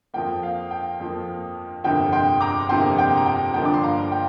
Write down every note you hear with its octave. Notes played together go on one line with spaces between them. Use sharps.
F2 F3 A#3 G5
F5
G5
F2 F3 A#3
G1 F2 C3 A#3 G5
G5 C6
A#5 D6
G1 F2 C3 A#3 G5 C6
G5
A#5
G5
G1 G2 D3 F3 A#3 G5
D6
C6
F5 A#5
G5